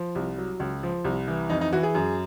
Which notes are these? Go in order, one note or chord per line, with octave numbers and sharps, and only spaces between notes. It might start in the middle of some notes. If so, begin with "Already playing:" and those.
Already playing: F3
C2
F#3
C#2
F3
C2
E3
F2 D#4
D#4
E3 F#4
G#4
F#2